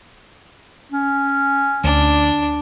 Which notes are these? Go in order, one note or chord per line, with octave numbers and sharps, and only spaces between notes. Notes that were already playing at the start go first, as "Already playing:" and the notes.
C#4
D2 D4